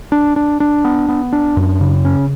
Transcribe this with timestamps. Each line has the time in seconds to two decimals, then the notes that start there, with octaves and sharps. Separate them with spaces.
0.12 D4
0.36 D4
0.60 D4
0.85 B3
1.09 B3
1.33 D4
1.57 F#2
1.81 C#3
2.05 C#4